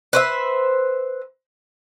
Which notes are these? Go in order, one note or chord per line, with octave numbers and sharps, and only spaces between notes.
B4 C5 E5